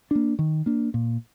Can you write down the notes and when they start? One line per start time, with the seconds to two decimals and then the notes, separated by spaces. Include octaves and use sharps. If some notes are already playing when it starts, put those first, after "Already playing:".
0.11 A#3 D4
0.39 D#3
0.66 A#3 D4
0.94 A#2